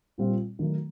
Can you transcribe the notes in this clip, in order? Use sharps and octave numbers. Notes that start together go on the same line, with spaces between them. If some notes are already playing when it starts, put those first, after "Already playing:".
A#2 G3 C4 F4
D#3 F#3 A3